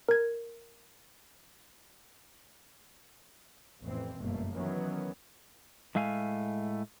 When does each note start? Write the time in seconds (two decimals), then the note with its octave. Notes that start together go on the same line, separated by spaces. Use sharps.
0.09 A#4 G#6
3.84 A1 F2 E3 C4
4.18 G1 F#2 B2 A3 A#3
4.55 D#3 E3 F#3 B3 C#4
5.95 A2 G#3 A3 F5 G#5